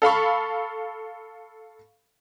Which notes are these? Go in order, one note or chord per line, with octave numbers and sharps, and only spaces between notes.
A4 F5 B5 C#6